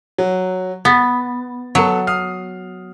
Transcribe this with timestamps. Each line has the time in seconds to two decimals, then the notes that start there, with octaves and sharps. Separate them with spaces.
0.18 F#3
0.85 B3 A6
1.75 F#3 B3 A4
2.07 D#6 F6 C7